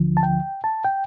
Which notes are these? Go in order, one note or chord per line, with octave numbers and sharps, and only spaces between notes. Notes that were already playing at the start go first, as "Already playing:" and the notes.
Already playing: D2 D3 F3
A5
G5
A5
G5